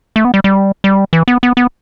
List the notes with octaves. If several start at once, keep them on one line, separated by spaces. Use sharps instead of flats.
A3
B3
G3
G3
G3
E3
B3
B3
B3